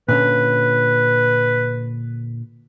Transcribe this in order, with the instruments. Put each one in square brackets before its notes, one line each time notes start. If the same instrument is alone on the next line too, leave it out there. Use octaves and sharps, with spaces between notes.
[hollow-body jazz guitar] A#2 D3 C#4 [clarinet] B4